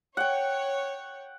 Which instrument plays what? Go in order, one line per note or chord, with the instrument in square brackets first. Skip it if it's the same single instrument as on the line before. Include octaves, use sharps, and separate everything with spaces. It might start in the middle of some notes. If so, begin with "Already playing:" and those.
[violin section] C#5 [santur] F#5 G5